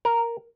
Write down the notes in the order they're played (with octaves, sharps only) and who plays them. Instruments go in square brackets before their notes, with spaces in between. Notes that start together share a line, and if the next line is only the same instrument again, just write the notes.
[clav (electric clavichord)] A#4